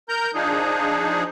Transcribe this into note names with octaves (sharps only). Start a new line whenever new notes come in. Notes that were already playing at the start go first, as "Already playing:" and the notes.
A#4 A#5 G6
F3 D4 D#4 G#4